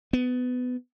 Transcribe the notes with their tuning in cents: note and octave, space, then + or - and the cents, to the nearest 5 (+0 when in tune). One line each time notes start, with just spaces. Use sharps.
B3 +20